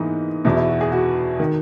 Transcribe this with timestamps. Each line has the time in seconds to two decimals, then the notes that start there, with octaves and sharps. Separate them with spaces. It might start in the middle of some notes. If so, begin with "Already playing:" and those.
Already playing: G#2 E3 A#3 B3 D#4
0.45 E2 B2 E4
0.57 E4
0.68 F#4
0.81 G#4
0.92 F#4
1.40 D#3